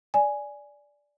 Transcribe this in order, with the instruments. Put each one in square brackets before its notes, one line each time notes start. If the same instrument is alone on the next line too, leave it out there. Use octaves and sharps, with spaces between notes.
[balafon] D5 G#5